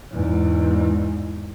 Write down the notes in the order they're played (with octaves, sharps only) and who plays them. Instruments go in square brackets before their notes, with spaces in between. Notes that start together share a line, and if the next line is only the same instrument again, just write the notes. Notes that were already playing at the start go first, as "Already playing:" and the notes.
[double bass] E2 G#2